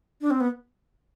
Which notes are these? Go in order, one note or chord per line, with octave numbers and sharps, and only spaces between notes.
D4
C4
B3